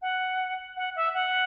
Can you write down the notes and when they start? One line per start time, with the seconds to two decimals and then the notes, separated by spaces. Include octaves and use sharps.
0.02 F#5
0.77 F#5
0.96 E5
1.14 F#5